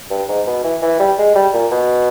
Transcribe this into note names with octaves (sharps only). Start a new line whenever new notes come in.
G2
G#2
B2
E3
E3
G3
G#3
G3
A#2
B2